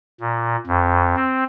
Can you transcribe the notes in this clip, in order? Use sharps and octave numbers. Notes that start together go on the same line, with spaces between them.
A#2
F2
C4